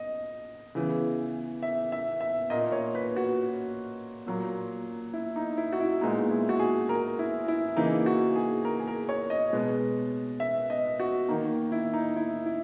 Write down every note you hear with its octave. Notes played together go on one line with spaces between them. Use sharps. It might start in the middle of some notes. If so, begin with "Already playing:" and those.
Already playing: D#5
C#3 E3 B3
E5
E5
E5
A#2 A#3 D#5
C#5
B4
F#4
A#2 F#3 A#3
E4
D#4
E4
F#4
E4
A#2 G#3 B3 D#4
E4
F#4
G#4
A#4
E4
E4
C#3 E3 A#3 D#4
F#4
G#4
A#4
G#4
A#4
C#5
D#5
B2 G#3 B3
E5
D#5
F#4
D#3 A#3 D#4
E4
D#4
E4
E4